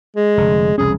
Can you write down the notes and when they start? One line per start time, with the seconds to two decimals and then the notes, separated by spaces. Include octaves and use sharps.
0.16 G#3
0.37 F1 D3
0.78 E1 C2 C#4 G#4